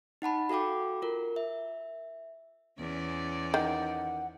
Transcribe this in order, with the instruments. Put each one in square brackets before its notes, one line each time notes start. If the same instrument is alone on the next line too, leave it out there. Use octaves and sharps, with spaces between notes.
[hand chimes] D#4 F#5 A5 B5
F#4 A4 F5 G5 D6
F4 A#4
E5
[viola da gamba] E2 C#4 D5
[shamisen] D#3 [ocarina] F#5